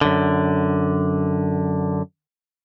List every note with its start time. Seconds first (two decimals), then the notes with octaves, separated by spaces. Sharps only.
0.01 F#2 D3